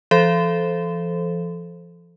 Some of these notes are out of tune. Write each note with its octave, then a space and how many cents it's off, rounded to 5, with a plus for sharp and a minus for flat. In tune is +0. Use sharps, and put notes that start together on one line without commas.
F3 -35 A4 -10 C5 +0